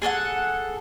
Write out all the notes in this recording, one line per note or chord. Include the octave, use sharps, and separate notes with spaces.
G#4 A4 F5 F#5